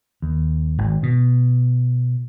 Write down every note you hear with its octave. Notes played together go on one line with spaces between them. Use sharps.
D#2
G#1
B2